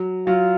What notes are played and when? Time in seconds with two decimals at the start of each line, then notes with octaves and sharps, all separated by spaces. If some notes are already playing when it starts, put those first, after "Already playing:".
Already playing: F#3
0.27 F#3 F4